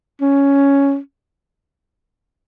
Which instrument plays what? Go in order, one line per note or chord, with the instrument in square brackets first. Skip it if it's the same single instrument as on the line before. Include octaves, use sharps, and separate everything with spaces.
[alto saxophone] C#4